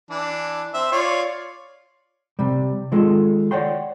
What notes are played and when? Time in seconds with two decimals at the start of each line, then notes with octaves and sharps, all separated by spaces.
0.10 E3 D4
0.74 C4 E5
0.92 F4 C#5 D5
2.39 C3 G3
2.92 D#3 G#3 F4 A4
3.51 C#5 D5 F#5 G5 C6